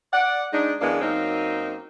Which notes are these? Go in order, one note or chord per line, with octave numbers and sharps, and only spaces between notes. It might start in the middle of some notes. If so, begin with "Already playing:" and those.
D5 F#5
G#3 D4 D#4
F#2 E3 G#3 A#3 B3 D4
F#2 F#3 A#3 C4 D#4